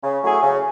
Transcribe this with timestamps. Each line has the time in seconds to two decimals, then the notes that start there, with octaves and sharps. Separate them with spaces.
0.02 C#3
0.22 F#3 A3 E4 G#4
0.43 C#3